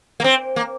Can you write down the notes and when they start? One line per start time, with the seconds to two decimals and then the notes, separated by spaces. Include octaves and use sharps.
0.20 A#3
0.24 C4
0.56 A#3